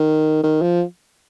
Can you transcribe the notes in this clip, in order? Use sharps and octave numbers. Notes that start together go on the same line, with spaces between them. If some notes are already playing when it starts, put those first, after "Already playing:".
Already playing: D#3
D#3
F3